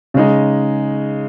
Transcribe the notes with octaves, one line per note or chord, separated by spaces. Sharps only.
C#3 G#3 D#4